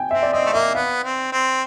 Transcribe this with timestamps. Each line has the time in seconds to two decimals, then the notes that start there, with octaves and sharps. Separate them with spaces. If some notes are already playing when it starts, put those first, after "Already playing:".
Already playing: G5 G#5
0.11 C4 E5
0.23 D5
0.33 C4 D#5
0.46 A3
0.53 A#3 E5
0.75 B3 F5
1.04 C4
1.33 C4